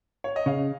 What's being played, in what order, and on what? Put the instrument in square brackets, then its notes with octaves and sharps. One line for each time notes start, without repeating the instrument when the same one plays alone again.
[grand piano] C#5
D#5
[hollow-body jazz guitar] C#3 [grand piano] F5